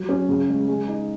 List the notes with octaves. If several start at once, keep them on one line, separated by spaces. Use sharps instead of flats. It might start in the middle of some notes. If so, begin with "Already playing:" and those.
Already playing: F#3
C#4
C#3
G#3
G#3
D#4